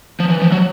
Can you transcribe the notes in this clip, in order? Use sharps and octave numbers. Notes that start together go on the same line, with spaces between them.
F3
E3
F3
F#3